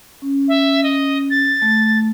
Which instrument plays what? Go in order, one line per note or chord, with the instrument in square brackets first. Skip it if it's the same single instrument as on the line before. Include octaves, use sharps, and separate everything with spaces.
[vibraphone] C#4
[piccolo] E5
D#5
A6
[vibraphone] A3